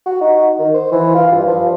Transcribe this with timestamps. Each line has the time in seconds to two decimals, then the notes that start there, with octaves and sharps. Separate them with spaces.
0.06 F#4
0.21 D#4
0.59 D#3
0.74 C5
0.92 E3
1.15 F4
1.32 G2
1.48 F3